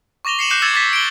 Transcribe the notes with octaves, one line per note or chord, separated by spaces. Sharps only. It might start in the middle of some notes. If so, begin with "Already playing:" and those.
C#6 D6 A#6 F7 G7
C7 C#7 E7 F#7
D6 F#6 G6 C7 C#7 E7
D6 E6 G#6 A6 C#7 E7
D6 A6 B6
D7 G7